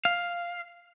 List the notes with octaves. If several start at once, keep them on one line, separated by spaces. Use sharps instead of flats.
F5